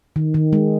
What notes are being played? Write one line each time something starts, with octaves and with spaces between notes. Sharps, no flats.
D#3
D#3
G#3